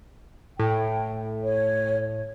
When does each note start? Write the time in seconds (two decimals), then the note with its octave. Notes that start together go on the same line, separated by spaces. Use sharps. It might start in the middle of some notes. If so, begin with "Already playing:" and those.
0.59 A2 G5
1.44 C#5